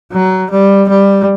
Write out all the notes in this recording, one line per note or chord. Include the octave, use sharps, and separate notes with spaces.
F#3
G3
G3